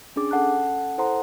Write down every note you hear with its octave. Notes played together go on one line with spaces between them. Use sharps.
C#4 D4 G#4 D6
C#4 A4 F#5 A5 F#6
E4 A4 C5 F#5 A#5 C6